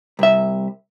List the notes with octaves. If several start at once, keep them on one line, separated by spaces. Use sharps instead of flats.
C2 E5